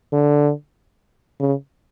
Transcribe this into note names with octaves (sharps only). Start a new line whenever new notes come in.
D3
C#3